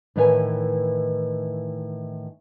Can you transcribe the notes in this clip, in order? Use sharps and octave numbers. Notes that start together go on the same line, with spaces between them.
A2 D#3 E3 B4 C#5 G#5